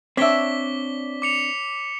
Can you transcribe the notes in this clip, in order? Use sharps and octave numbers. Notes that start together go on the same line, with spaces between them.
C4 D4 C#5 E5 D6 B6 G7
D6 C#7 F7